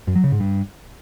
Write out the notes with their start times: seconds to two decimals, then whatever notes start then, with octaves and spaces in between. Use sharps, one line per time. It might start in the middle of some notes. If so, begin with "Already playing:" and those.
0.07 F#2
0.16 F#3
0.24 C#3
0.32 G#2
0.40 G2